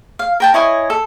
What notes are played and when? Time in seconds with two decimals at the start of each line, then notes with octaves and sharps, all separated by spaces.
0.19 F5
0.40 A#4 G5 A5
0.54 E4 C#5 D#5 G#5
0.90 A4